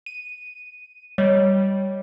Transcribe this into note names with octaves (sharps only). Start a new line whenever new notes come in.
D#7
G3 C#5 D#5